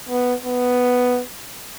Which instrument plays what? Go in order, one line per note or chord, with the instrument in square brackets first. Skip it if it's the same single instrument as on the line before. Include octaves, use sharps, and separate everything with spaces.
[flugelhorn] B3
B3